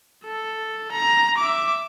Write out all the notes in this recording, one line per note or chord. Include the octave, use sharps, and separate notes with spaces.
A4
A#5
E5 D6